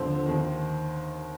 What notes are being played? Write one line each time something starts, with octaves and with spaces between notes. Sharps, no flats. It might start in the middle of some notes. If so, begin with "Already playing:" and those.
Already playing: D#2 D3 F3 C4 C5
D#2 D#3